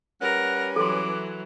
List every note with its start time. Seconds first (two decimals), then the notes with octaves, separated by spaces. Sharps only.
0.22 G3 C#4 A#4 B4 F#5
0.76 E3 F#3 A4 C6 D6